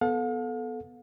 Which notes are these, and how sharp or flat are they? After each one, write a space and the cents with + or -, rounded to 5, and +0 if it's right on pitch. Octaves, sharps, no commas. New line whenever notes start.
B3 +0 A4 -10 F5 +45